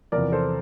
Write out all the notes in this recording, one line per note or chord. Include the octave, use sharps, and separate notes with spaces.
E2 C3 F3 A#4 D5
A4 C5